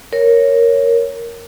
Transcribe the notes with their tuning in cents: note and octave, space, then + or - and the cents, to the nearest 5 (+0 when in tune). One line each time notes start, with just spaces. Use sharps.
A#4 +0 C#5 +0